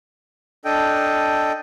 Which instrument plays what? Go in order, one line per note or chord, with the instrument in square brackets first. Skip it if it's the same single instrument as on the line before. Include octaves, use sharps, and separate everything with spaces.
[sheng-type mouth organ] D4 A4 D#5 G5